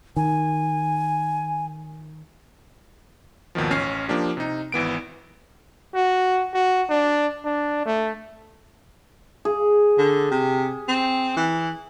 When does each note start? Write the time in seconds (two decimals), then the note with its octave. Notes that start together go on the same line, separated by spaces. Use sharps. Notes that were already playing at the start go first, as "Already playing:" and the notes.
0.16 D#3 G#5
3.55 G#1 D#2 B2 D#3 F3
3.71 A1 C#4 F6 C7
4.08 F3 A#3 D4 G4
4.37 C3 D#4
4.72 G#1 E3 B3 D7
5.95 F#4
6.54 F#4
6.90 D4
7.44 D4
7.85 A3
9.45 G#4
9.98 D3
10.31 C3
10.88 C4
11.37 E3